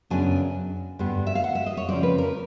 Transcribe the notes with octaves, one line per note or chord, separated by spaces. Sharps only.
F#2 C#3 F#3 B3 D4 G#5
G2 D3 G3 B3
E5
F5
F#5
E5
D#5
C#5
C#3 F3 G#3 C4 D5
B4
A#4